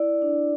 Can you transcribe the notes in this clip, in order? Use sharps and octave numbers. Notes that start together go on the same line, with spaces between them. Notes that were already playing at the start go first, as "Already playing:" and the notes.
Already playing: E4 D5
D4